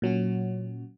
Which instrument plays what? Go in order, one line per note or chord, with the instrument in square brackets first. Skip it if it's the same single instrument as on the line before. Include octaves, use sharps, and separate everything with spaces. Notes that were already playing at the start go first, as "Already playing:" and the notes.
[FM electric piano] A#2 F#3 C#4 F#4